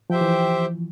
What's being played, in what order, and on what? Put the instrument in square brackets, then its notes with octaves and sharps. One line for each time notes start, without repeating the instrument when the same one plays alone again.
[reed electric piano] F3 [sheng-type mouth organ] G4 C5 E5 G5
[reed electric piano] E3